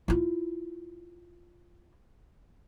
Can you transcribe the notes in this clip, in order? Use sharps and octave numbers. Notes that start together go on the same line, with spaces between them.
E4 F4